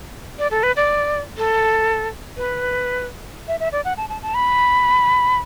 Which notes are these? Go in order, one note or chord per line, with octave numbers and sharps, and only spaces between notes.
D5
A4
B4
D5
A4
B4
E5
E5
D5
F#5
A5
A5
A5
B5